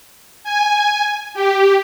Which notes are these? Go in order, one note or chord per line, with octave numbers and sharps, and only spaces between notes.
G#5
G4